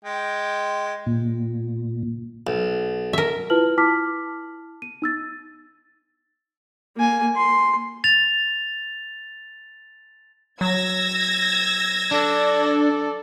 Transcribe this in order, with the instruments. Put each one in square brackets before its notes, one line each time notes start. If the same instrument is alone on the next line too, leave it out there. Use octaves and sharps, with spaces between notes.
[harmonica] G#3 G5
[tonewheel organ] A#2
[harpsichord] B1
[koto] A#4 E5
[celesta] E4 F4 B4 A5 F6 F#7
E4 A5 D6 F6 B6
D#7
D#4 E6 A6
[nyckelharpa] A#3 G#5
C6
[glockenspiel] A6 F7
[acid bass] F#3 [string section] E6 G#6 A#6
[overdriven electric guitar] D4 [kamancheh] A4 D5